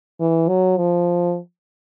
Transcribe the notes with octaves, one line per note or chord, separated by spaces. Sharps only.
E3
F#3
F3